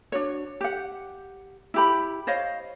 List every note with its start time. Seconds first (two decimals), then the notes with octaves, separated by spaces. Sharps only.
0.12 D4 F#4 C#5
0.61 G4 F#5
1.74 E4 G4 B5
2.27 C5 C#5 D#5 F5